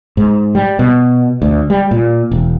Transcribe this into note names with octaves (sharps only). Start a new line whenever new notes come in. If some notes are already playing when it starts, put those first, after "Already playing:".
G#2
G3
B2
D2
G3
A#2
E1